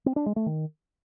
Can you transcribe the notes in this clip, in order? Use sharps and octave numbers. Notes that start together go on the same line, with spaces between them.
C4
D4
G#3
A3
D#3